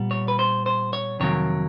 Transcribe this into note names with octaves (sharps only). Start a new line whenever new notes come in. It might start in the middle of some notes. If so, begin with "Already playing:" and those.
Already playing: A#2 G3 B3
C#5
B4
C5
C5
C#5
F2 C3 D#3 F#3 A#3 C#5